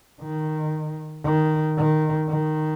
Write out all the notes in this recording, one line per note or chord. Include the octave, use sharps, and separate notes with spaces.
D#3
D#3
D#3
D#3